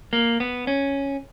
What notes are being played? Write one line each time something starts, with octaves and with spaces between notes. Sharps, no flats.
A#3
B3
C#4